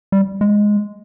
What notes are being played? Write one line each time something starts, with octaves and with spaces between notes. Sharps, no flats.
G3
G#3